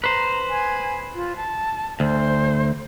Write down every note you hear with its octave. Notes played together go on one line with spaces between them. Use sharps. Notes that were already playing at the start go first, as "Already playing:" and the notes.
B4 C5 A#5
G#5
F4
A5
D2 C5